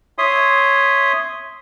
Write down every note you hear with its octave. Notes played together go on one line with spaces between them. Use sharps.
C#5 E5 C6 D#6